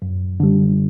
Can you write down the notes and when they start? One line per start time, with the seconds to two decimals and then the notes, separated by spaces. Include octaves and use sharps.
0.02 F#2
0.40 D3 G3